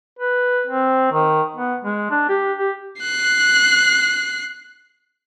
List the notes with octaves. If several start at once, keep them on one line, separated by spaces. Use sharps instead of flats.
B4
C4
D#3
B3
G#3
D4
G4
G4
F#6 C7